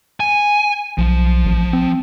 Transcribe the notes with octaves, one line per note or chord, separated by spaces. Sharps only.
G#5
B1 F3
A1
C4